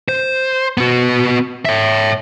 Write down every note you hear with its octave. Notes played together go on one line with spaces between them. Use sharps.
C5
B3 F#4
C#5 E5